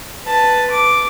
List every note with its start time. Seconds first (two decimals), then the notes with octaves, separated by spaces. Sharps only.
0.24 B4 A5
0.71 D6